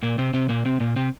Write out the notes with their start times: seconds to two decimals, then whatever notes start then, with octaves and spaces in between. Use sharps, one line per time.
0.03 A#2 A#3
0.18 C3 C4
0.34 C3 C4
0.49 A#2 A#3
0.65 C3 C4
0.80 A#2 A#3
0.96 C3 C4